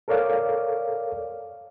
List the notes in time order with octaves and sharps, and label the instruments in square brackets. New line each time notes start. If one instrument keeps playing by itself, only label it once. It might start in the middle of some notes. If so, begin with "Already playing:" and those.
[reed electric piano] A4 A#4 C#5 D5 F5